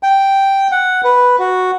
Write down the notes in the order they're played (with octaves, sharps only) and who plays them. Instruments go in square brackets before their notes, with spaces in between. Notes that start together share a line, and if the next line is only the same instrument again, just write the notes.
[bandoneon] G5
F#5
B4
F#4